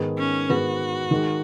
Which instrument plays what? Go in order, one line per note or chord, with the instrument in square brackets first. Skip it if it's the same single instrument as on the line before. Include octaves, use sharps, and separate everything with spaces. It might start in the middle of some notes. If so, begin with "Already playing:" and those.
Already playing: [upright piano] G#2 D#3 B3 G#4 B4
[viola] C#4
[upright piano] G#2 D#3 B3 G#4 B4 [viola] F#4
[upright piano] D#3 G#3 D#4